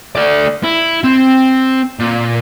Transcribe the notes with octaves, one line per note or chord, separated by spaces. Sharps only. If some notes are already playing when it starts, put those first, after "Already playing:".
A3 D5
E4
C4
A#2